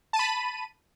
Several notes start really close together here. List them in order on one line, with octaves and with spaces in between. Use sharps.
A5 D#7 B5